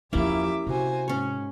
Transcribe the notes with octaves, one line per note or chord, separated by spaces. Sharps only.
E2 F3 A#3 C#4 E4 G4 E5 D6
C3 F#4 C5 G#5
G#2 C#4 C#5